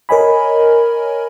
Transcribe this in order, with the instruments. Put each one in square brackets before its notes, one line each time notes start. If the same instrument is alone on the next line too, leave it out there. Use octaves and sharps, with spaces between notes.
[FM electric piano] A#4 C#5 D#5 G#5 B5